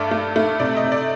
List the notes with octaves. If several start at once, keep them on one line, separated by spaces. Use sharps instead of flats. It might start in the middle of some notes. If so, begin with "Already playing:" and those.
Already playing: G2 A3 D5
A3
A3
C3 D5
D#5
C3
D5